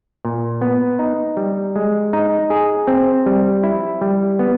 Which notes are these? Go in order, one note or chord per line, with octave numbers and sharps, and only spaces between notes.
A#2
B3
D#4
G3
G#3
D#4
G#4
C4
G3
E4
G3
B3